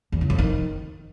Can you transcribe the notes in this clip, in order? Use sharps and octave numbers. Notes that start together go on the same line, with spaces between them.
E2
C#3
F2
D#3